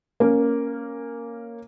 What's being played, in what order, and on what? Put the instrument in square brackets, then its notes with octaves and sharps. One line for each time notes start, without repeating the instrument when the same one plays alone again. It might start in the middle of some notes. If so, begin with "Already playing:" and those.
[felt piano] A#3 C#4